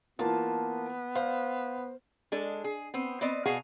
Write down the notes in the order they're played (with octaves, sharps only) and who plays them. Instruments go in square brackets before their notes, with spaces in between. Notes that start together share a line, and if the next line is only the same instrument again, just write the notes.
[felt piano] E3 A#3 F4 [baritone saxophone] B3 [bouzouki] A5
[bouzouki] C5 [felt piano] F5
[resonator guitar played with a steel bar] G#3 D4 A4
G#4
B3 C4
B3 C4 D5 D#5
B2 G#4 F5 F#5 A5